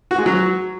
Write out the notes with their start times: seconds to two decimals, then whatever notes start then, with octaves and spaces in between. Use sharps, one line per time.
0.11 F#4
0.18 G#3
0.26 F#3